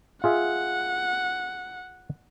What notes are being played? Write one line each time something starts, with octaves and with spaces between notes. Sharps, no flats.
F4 G#4 E5 F#5